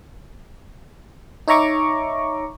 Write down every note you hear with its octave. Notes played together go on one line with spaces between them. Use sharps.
D#4 C#5 E5 A#5 C#6 D6